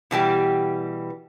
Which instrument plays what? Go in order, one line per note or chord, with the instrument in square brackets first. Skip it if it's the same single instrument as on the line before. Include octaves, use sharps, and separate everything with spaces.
[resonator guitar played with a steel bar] B2 E3 G3 G4